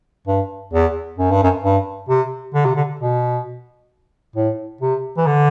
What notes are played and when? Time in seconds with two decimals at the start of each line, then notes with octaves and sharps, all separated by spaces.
0.27 G2
0.73 E2
1.18 F#2
1.30 G2
1.43 F#2
1.64 G2
2.09 C3
2.54 D3
2.65 C3
2.76 D3
3.00 B2
4.36 A2
4.81 C3
5.17 E3
5.26 D3